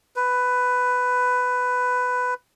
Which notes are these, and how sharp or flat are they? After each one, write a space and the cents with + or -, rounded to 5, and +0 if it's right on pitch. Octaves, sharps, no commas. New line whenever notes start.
B4 +10